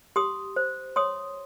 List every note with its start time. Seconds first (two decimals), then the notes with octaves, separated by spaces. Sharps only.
0.16 G4 C6 D#6
0.56 C5
0.96 C#5 C6 D#6